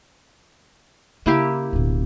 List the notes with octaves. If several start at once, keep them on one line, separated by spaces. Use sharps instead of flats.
C#3 A#3 E4 G4
D1 B2